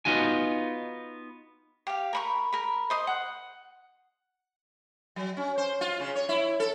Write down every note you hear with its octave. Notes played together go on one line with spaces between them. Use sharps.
B3 D#4 F4 F#4 G#5
G4 F5
A#4 B5 C#6
A#4 B5
C5 D#5 C6
F#5
F#3
C#4
C5
F4
C#3
C#5
E4
A4